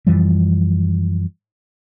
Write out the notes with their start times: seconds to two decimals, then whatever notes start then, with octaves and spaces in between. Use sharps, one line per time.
0.07 F#2 E3 F3 G3